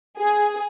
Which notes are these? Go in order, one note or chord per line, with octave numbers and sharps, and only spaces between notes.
G#4